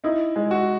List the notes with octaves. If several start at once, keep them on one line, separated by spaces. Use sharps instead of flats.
D#4 E4
G#3
F#4